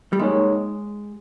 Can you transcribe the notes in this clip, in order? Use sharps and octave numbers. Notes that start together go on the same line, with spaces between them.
G3
G#3 A#3 D#4 G#4 C#5